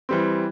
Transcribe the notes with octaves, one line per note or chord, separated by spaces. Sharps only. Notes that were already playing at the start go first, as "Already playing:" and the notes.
E3 G3 C4